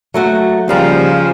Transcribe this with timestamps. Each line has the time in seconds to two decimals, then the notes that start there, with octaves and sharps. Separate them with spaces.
0.14 F#3 A3 F#4
0.68 D#2 C#3 F3 G3 A#5